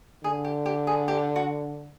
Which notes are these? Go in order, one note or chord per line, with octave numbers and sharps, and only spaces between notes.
D3 G#4
G4
G4
G#4
G4
F#4